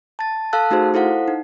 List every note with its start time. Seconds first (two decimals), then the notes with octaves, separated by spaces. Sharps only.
0.19 A5 A6
0.53 A4 F5 A5 E6 F#6
0.71 A3 D#4 F#4 G#4 C5
0.94 E4 A4 C5 F5 F#5
1.28 D#4